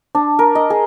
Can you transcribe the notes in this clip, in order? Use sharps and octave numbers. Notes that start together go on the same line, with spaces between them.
D4
A#4
D#5
G#4